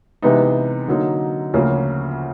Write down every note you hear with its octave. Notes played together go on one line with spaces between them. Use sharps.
C3 E3 G#3 B3 D#4
D3 F#3 A#3 D#4
D2 C#3 F3 A#3 C#4